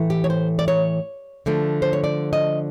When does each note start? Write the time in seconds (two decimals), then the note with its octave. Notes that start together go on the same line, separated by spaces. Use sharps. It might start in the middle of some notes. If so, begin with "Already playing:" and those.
Already playing: A2 E3 A3
0.10 G4
0.24 C#5
0.30 C5
0.59 D5
0.68 C#5
1.46 D3 F3 A3
1.82 C5
1.93 C#5
2.04 D5
2.33 D#5